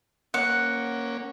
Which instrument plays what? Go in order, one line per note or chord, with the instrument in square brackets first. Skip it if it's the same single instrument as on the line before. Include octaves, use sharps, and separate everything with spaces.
[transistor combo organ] A#3 C#4 [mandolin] F#5